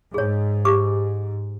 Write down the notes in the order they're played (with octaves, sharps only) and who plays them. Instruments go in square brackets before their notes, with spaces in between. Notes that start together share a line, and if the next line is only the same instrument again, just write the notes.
[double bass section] G#2 [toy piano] G#4 C#5
[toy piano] G4 D6